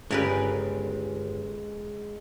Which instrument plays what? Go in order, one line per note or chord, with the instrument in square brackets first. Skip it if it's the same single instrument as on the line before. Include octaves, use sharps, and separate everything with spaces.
[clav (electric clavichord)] G1 G4 D5 [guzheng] C#3 A#4 B4 [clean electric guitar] G#3